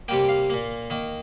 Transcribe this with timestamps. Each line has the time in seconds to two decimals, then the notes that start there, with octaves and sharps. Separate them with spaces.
0.08 C3 G3 A#3 G5
0.29 F5
0.50 A#2 A#3
0.90 D#3 A#3